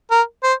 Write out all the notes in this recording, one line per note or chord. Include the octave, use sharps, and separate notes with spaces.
A#4
C5